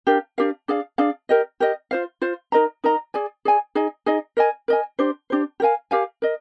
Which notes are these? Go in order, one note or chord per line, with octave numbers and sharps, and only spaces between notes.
D4 G4 A#4 F5
D4 G4 A#4 F5
D4 G#4 D5 F5
D4 G#4 D5 F5
G4 A#4 D#5
G4 A#4 D#5
F4 C5 F5
F4 C5 F5
D#4 A#4 D#5 A#5
D#4 A#4 D#5 A#5
G#4 D5 G#5
G#4 D5 G#5
D#4 G#4 D#5 G#5
D#4 G#4 D#5 G#5
A#4 D#5 G#5
A#4 D#5 G#5
D4 G4 C5
D4 G4 C5
G4 A#4 F5 G#5
G4 A#4 F5 G#5
A#4 D#5